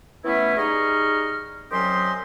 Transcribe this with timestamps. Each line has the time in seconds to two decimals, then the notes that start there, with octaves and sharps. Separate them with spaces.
0.25 E3 A3 B3 C#4 E4
0.56 G3 D#4 G#4 D#5 C#6 F6
1.71 C2 F#3 C#4 G4 D#5 C6